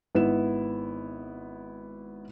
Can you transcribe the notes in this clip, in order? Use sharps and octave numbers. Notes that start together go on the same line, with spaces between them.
G#1 B3 E4 E7